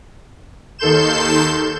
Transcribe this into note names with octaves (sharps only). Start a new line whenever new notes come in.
D#2 D#3 A4 C6 G6 E7